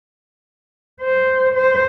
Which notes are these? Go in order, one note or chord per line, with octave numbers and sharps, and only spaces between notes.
C5
C5